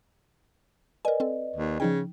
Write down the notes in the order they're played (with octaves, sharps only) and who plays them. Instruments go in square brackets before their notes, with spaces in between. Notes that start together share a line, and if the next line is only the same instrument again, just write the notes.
[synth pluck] A#4 G#5 [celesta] B4 D5 D#5
[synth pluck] C4 A4
[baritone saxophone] D#2
[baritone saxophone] C#3 [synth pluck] F3 D#4 G5